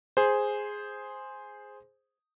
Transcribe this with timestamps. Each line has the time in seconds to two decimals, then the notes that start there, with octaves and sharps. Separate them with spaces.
0.17 G#4 C5